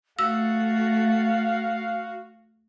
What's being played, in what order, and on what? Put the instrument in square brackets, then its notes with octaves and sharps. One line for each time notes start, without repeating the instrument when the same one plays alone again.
[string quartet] A3 [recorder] F#4 [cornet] F5 [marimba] E6